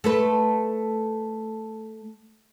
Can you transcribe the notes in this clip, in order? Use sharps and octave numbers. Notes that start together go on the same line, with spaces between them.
A3 A4 B4